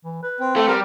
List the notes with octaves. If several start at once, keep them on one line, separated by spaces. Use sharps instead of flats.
E3
B4
C4
A3 A4
G3 A#4